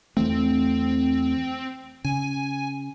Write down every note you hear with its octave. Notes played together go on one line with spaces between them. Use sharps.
E2 E3 A3 C4
C#3 G#5